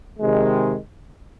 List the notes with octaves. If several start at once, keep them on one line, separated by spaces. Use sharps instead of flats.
C3 D#3 G#3